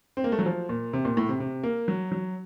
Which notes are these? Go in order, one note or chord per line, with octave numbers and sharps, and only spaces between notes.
C4
A#3
A3
F#3
F3
A#2
C3
A#2
A2
C3
C3
A#3
F#3
F#3